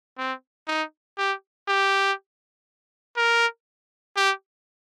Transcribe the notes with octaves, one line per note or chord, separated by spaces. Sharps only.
C4
D#4
G4
G4
A#4
G4